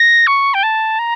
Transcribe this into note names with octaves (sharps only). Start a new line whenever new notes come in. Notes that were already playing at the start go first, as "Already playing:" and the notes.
Already playing: A#6
C#6
G5
A5
A#5